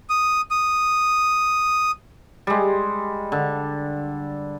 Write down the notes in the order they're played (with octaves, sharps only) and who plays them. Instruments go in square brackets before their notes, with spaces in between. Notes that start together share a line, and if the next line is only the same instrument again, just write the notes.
[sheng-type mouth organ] D#6
D#6
[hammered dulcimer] G3 G#3
D3